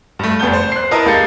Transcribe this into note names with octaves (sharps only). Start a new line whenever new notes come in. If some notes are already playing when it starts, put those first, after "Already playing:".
G2 A3
F1 B3 A4 G6 G7
C5
F#6 C7
E4 A#4 B4 D#5 A5 A#5
C#2 A#3 G4 G6 A6 C#7